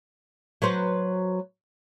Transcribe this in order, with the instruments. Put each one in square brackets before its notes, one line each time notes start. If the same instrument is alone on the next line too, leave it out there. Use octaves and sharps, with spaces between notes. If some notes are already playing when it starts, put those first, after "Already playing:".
[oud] F#3 B4 C5